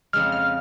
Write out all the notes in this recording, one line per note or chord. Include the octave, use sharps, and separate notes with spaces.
F2 C#3 G#3 F6
F6